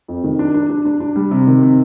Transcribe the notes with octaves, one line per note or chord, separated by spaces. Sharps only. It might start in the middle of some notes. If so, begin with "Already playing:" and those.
F2
D#3
D4
D4
D4
D4
D4
G3
C3
D#3
C3